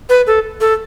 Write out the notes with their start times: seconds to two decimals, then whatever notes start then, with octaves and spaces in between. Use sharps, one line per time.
0.09 B4
0.27 A4
0.61 A4